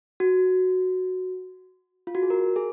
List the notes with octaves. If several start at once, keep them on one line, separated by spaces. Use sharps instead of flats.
F#4
F4
F#4
G#4
A#4
G#4